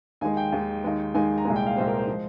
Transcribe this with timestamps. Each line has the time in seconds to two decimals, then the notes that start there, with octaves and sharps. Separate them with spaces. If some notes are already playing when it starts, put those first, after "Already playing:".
0.21 D#2 D#3 G#3 G#5
0.37 G5
0.52 D#2 D#3 G#3
0.84 D#2 D#3 G#3
1.14 D#2 D#3 G#3 G#5
1.38 A#5
1.45 C2 A#2 G#3 G#5
1.56 G5
1.66 F5
1.77 C2 A#2 G#3 C5
1.87 A#4
1.98 C5
2.08 F3 G#3